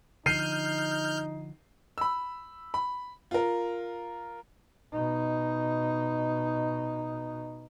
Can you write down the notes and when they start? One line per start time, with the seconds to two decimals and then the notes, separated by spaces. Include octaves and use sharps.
0.26 D3 F3 D#4 F6 G6 C7 D#7
1.98 B5 E6
2.74 B5
3.31 F4 A#4
4.93 B2 D#4